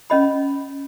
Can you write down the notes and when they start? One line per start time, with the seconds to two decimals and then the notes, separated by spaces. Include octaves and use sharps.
0.10 C#4 D#5 B5